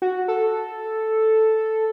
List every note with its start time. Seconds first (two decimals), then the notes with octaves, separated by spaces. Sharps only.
0.02 F#4
0.28 A4